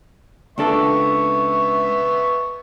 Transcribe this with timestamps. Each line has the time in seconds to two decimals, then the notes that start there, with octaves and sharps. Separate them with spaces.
0.58 C#2 B3 D4 A4 E5 C#6